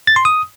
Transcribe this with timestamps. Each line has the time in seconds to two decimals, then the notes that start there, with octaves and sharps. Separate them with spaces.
0.07 A6
0.16 C6
0.25 D#6